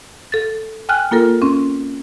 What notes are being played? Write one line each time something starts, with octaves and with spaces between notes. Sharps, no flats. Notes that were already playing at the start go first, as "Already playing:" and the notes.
A4 A6
G5 G#5 F6 F#6
A#3 F4 A4 A#4
C4 C#4